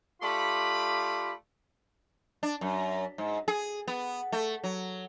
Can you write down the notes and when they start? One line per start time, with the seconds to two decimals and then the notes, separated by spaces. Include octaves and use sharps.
0.22 A3 F4 G4 D5 B5
2.43 D4
2.61 F#2
3.18 G#2
3.48 G#4
3.88 B3
4.32 A3
4.64 F#3